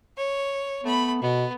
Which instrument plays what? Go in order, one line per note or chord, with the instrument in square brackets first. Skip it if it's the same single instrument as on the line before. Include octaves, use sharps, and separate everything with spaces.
[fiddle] C#5
[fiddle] A3 B5 [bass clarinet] B3
[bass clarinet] B2 [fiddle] B3